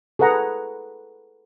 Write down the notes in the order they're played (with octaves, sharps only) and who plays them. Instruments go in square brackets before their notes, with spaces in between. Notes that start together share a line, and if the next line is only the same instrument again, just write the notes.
[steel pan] G#4 A4 B4 F#5 A#5